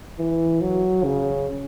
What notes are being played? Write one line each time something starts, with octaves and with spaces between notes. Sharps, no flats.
E3
F#3
C#3